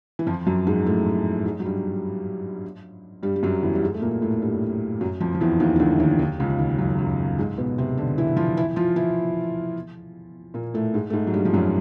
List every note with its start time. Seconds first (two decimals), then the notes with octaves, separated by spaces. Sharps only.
0.19 E3
0.27 F2 F3
0.46 F#2 F#3
0.67 G#2 G#3
0.86 A2 A3
1.45 G#2 G#3
1.60 F#3
1.65 G2 G3
3.23 G2 G3
3.36 G3
3.43 F#2 F#3
3.63 E2 E3
3.75 G3
3.83 G#2 G#3
3.94 A3
4.02 A#2 A#3
4.22 A2 A3
4.42 G2 G3
5.01 F#2 F#3
5.20 F2 F3
5.35 F3
5.41 E2 E3
5.60 D#2 D#3
5.76 D#3
5.80 D2 D3
6.00 D#2 D#3
6.19 D#2 D#3
6.40 C#2 C#3
6.59 D#2 D#3
6.78 F#2 F#3
6.98 F#2 F#3
7.39 G#2 G#3
7.58 B2 B3
7.78 C3 C4
7.98 D3 D4
8.18 E3 E4
8.37 F3 F4
8.57 E3 E4
8.76 F3 F4
8.96 E3 E4
10.54 A#2 A#3
10.74 A2 A3
10.94 G#2 G#3
11.10 A3
11.13 G#2 G#3
11.27 F#3
11.33 G2 G3
11.45 F3
11.54 F#2 F#3